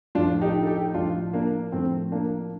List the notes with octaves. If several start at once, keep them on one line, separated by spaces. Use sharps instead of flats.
A2 F3 D4 F4
D#4 G4
A4
D#4 G4
A2 F3 D4 F4
A#3 D4
A2 F3 A3 C4
A#3 D4